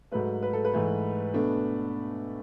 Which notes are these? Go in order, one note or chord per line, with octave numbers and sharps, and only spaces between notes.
G#2 F#3 A3 B4
B4
A4
B4
G#2 E3 A3
B2 A3 D4